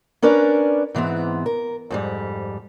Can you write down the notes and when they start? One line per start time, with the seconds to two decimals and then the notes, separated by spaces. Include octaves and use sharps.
0.22 C#4 D4 A#4 B4 D5
0.94 G#2 E3 B3 C4
1.46 A#4
1.90 F2 G#2 G3